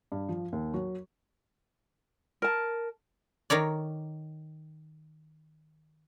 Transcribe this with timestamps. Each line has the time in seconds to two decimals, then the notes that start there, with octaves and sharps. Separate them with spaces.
0.12 G2
0.29 F3
0.52 D#2
0.74 F#3
2.42 A#4 A5
3.50 D#3 A#4 C#5 D5